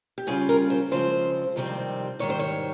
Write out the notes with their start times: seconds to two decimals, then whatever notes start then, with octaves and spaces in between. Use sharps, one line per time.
0.18 G4
0.27 C#3 G3 C#4 F4 G#4
0.49 A#4
0.70 C5
0.91 C#3 F3 G#3 C4 C5
1.56 F2 C3 D#3 G3 C4
2.19 G#2 D#3 G3 C#5
2.30 C5
2.39 C#5